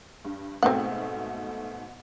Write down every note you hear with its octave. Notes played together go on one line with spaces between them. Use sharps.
G2
G#2 B2 A3 C4 F#5